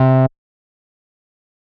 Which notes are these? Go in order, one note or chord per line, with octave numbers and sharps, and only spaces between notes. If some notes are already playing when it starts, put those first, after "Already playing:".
Already playing: C3